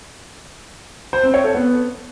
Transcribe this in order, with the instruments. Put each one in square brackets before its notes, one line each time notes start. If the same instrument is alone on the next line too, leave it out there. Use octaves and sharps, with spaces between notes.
[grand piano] C5
C4
C#5
A4
B3